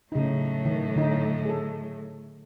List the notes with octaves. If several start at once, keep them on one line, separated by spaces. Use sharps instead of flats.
A2 C#3 F#3 D#4
D#3
D3 D#4
G#4 A4